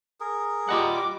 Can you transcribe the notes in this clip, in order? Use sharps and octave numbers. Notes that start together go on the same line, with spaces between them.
G#4 A#4
G3 F4 D#5 F#5 D6